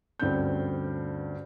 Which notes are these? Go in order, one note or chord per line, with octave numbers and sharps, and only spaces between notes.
D2 G2 C4 C#4 G6